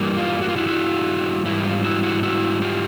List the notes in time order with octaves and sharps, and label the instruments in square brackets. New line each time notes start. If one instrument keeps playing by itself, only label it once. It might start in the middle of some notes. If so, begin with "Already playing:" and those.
Already playing: [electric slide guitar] G2 E3 G3 A#3
F4
F#4
F4
E4 F#4
E4 F#4
G#2 E3 G3 E4
F4
E4 F#4
E4 F#4
E4 F#4
F4 G4